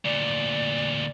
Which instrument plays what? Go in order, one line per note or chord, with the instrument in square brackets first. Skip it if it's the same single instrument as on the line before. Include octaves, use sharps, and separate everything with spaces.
[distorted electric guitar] D2 A#2 [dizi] D5